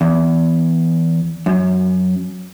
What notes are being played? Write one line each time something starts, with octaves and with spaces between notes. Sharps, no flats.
E2
F#2